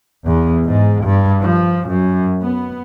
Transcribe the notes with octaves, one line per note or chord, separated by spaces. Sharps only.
E2
G#2
G2
F3
F#2
B3